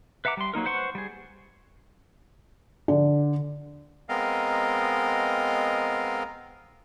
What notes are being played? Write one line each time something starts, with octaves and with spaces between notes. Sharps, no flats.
B4 E5 F#5 A#5 D6
G3 C6
F#3 A#3 D#4 A#4
B4 C5 F#5 C6 C#6
G3 G#4
D3
G#3 B3 C4 A#4 D#5 F5